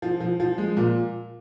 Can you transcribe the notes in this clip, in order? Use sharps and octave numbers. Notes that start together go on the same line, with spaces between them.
F3
F3
F3
G#3
A#2